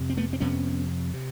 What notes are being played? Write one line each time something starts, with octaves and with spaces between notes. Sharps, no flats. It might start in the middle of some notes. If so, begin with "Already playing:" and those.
Already playing: F2 C3
C4
A3 B3
C4
F2 C3 B3 C#4
C3